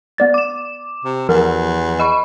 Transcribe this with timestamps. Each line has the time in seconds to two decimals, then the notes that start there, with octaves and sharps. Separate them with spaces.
0.18 B3 D5 A6
0.34 D6 E7
1.05 C3
1.29 E2 F3 A#4
1.99 D#5 B5 C#6